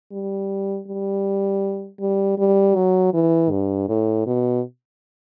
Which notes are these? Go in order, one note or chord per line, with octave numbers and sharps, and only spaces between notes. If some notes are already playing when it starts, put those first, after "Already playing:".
G3
G3
G3
G3
F#3
E3
G2
A2
B2